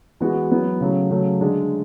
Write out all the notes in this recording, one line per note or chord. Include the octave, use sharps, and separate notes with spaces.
E3 G#3 B3 F#4
F#3 B3 E4
C#3 F#3 A3
C#3 F#3 A3
D3 G#3 D4